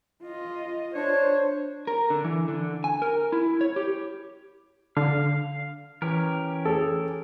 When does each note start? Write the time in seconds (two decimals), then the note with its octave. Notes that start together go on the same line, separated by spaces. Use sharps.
0.23 F4 D#5
0.94 D4 C5 C#5
1.87 A#4
2.10 D3
2.25 E3
2.48 D3
2.84 G#5
3.02 A#4
3.32 E4
3.61 C#5
3.76 G4
4.97 D3 F5
6.02 E3 C#4 G4 A#4
6.65 G#4 A4